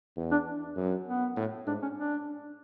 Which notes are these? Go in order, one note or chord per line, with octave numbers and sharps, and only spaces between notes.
E2
D4
F#2
B3
A2
G#2 D4
C#4
D4